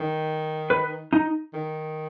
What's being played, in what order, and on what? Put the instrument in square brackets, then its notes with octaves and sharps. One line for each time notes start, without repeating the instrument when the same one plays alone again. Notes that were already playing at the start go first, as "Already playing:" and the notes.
Already playing: [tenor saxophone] D#3
[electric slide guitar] B4
D#4
[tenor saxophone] D#3